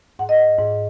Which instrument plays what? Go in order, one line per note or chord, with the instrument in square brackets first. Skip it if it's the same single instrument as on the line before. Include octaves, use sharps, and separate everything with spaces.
[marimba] G#2 F#5
D#5
F#5
G#2